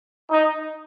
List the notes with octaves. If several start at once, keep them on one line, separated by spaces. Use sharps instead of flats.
D#4